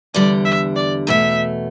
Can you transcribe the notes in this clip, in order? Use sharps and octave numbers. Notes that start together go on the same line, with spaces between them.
E2 D3 G3 D5
E5
D5
E2 B2 A3 E5